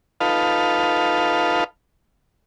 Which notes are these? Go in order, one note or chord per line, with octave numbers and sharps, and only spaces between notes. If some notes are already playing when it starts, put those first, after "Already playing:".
D#4 F4 A4 B4 F5